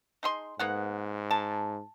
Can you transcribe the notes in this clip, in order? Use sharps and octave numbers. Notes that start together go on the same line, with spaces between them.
D#4 G#4 C6
G#2 A#3 B3 F#5
A5